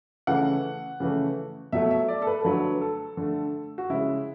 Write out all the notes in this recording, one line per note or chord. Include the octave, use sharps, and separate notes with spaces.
C#3 E3 A3 F#5
C#3 E3 A3
B2 F#3 A3 E5
E5
D5
A4
B4
A4
D3 F#3 A3 B4
A4
D3 A3
F#4
C#3 G#3 E4